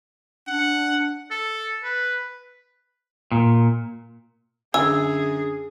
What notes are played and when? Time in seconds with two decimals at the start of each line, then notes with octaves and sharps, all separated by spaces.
0.48 D4 F#5
1.31 A4
1.83 B4
3.32 A#2
4.74 F#2 D3 G#4 G#5 E6